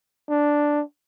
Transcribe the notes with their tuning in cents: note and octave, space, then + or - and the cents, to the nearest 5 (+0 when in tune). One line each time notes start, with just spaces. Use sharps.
D4 +0